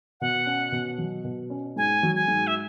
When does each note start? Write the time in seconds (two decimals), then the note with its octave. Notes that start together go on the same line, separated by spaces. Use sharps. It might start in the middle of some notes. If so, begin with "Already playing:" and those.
0.21 B2 F#5
0.46 C#4
0.72 B2
0.98 F#3
1.24 B2
1.50 C#4
1.76 G#2 G#5
2.03 F#3
2.15 G#5
2.28 G#2
2.47 E5